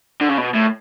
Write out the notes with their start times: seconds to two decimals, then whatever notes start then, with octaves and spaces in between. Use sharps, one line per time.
0.21 D3
0.29 C#3
0.38 B2
0.54 A2